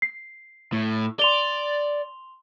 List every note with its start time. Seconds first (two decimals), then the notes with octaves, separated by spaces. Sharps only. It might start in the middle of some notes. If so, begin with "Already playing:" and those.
0.02 C7
0.73 A2
1.19 D5 C6 F7 G7